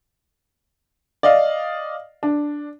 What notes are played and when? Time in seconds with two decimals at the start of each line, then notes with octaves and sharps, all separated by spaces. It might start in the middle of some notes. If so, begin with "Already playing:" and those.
1.23 D5 D#5 F5
2.23 D4